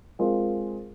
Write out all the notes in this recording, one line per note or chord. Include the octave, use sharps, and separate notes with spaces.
G#3 C4 F4 A#4